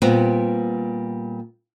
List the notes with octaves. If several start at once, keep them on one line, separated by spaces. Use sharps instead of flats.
A#2 G3 B3 C4